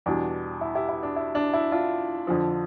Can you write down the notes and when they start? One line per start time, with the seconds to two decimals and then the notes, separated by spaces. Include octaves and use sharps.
0.06 E2 B2 G3 D4
0.61 E4
0.75 E4 G4
0.89 E4
1.03 D4
1.16 E4
1.35 D4
1.53 E4
1.72 D4 F4
2.27 F2 D3 F3